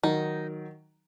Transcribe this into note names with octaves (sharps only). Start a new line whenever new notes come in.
D#3 F#3 D#4